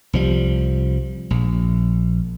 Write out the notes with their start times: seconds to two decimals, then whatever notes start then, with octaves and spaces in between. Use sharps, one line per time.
0.13 C2 F3 G3
1.30 A#1